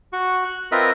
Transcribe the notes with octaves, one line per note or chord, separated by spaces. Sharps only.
F#4 C#6
F#6
C4 F4 A#4 B4 D#5 E5